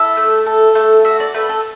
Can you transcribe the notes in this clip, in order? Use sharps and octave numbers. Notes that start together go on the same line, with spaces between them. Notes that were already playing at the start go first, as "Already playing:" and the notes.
Already playing: E4 A4 E5
A3
A4
A3
F#4 E5
D5
A3 B4
A4